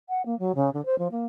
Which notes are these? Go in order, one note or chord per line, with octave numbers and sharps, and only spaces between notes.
F#5
A#3
F#3
C#3
D3
C5
F3
A#3